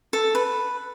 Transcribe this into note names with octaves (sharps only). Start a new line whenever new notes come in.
A4
B4